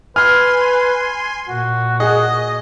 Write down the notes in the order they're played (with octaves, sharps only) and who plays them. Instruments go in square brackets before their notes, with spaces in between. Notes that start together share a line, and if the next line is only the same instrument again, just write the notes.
[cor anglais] B4 [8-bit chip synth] G#5 C6 [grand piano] F6
[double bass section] A#2 [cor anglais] F#4
[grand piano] G#4 [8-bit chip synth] D#5